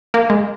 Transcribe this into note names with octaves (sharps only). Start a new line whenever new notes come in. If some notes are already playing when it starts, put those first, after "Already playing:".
A#3
G#3